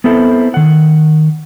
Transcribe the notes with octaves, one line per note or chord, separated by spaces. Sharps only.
B3 C4 E4 A4
D#3 F#5